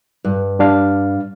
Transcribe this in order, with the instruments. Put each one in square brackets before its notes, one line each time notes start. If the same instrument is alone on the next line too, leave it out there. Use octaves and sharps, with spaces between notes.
[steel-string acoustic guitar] G2
[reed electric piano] G3 D4 F5